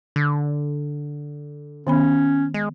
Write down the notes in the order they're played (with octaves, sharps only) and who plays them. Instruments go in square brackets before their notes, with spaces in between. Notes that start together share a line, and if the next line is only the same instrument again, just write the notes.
[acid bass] D3
[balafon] D#3 B3 B5 [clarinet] C#4
[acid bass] G#3